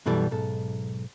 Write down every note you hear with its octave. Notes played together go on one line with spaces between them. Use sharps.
F#2 B2 E3 G3 A4
B1 G#2 A4